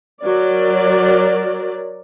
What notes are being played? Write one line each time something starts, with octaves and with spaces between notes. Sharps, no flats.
F#3 A#4 D5